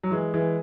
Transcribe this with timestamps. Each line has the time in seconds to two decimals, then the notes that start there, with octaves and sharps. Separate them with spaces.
0.03 F#3
0.11 E3 G#3
0.34 E3 G#3